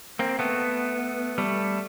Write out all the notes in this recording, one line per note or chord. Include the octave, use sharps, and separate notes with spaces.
A#3 C4
A3 B3
G3 A3